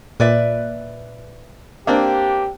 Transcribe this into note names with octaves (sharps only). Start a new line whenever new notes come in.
A#2 B4 D5 E5
A#3 C4 D4 G4